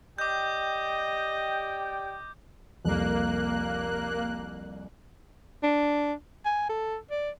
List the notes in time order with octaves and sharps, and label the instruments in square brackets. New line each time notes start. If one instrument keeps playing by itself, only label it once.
[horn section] G4 D5 G5 [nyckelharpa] D#5 [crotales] D6 G6
[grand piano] C2 F2 [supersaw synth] A#3 F#6
[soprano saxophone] D4
G#5
A4
D5